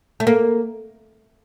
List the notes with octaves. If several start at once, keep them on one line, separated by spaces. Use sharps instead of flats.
A3
A#3